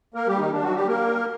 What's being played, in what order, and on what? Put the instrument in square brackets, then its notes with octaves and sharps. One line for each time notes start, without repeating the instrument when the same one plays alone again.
[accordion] A#3 A#4
G3 G4
D#3 D#4
D4
F#3 F#4
G3 G4
A#3 A#4